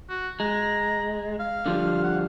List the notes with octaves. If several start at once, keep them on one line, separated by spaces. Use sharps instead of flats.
F#4
G#3 A#5
F5
D3 F3 G3
F#5